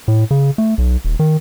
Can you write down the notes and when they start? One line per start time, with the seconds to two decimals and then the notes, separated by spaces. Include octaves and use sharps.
0.08 A2
0.31 C#3
0.58 A3
0.78 B1
1.05 D#1
1.19 D#3